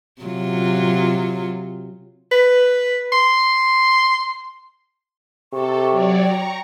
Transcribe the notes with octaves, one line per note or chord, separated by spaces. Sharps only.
C3 F#3 F4
B4
C6
C3 A4 C#6
F#3 C#5 D5
G5 A#5 C#6